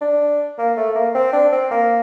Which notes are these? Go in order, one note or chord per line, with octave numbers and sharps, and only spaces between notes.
D4
A#3
A3
A#3
C4
D4
C4
A#3